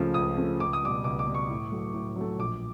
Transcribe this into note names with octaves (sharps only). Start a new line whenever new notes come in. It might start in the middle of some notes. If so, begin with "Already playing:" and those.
Already playing: C#2 C#3 F3 A3
C#2 D#6
C#3 F3 A3
C#2 D6
D#6
B2 G3 D6
C#2 D6
D6
B2 G3
C#6
A2
F#3 A3
A2
F#3 A3
A#1 D6